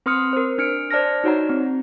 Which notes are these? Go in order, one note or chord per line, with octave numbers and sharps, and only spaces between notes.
C4 B4 C6 D#6 F6 C#7
A#4 C5
D4 F6 C#7 D7
C5 D5 A5 F6 A#6
D#4 F#4 C#5 F#5 A#5
C4